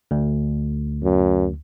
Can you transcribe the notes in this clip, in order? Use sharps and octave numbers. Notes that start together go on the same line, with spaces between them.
D2
F#2